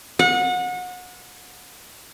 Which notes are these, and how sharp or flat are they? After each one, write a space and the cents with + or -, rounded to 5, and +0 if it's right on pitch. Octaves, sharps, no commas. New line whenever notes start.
F#5 -30